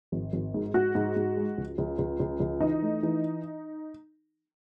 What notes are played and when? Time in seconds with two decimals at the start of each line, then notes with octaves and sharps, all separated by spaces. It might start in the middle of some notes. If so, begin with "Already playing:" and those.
0.12 G#1
0.33 G#1
0.54 G#2
0.74 G#2 F#4
0.95 G#2
1.16 G#2
1.37 G#3
1.58 C#2
1.78 C#2
1.98 C#2
2.20 C#2
2.40 C#2
2.61 E3 D#4
2.82 A3
3.03 E3